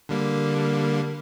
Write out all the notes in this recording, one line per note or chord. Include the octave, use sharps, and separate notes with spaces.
D3 G3 A#3